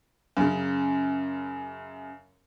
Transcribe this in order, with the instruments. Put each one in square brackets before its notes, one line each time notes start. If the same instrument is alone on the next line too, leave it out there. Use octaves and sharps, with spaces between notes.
[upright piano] F#2 C#3